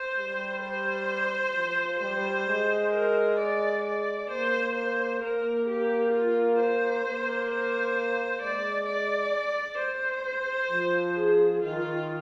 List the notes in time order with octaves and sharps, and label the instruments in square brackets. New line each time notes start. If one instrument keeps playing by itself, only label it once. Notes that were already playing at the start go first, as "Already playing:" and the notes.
Already playing: [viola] C5
[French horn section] G3
[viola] C5
[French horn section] F3
[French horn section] G3 [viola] C5
[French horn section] G#3
[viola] A#4
D5
D5
[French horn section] A#3 [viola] C5
[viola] C5
[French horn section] A#3 [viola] A#4
[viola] G4
F4
C5
[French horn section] A#3
[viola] C5
[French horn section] G#3 [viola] D5
[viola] D5
C5
[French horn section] F3
[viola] G#4
[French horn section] D#3 [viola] F4